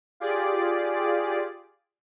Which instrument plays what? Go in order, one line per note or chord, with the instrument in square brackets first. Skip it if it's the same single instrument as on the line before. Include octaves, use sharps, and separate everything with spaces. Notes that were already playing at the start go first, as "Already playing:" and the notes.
[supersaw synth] F4 G4 G#4 D5